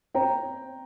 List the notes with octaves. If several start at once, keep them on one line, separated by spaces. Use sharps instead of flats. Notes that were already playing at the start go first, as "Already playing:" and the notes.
C4 G5 A#5